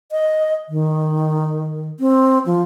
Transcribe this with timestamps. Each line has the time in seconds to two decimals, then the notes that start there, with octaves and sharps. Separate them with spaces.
0.12 D#5
0.69 D#3
2.00 C4
2.46 F3